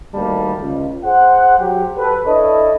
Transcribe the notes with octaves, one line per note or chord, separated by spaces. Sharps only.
D2 D#3 G3 A#3 A5
C#2
G#4 C5 F#5
F#3 G4
A4 B4
D4 E4 A4 C#5 D#5